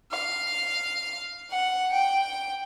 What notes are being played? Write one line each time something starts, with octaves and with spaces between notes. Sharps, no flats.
F5
F#5
G5